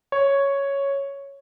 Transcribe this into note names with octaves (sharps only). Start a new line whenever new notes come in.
C#5